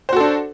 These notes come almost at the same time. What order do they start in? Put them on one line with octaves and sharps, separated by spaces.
C5 F#4 A4 D4